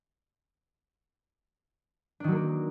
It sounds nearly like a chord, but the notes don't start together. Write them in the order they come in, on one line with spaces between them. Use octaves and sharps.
D4 D#3 F#3 A#3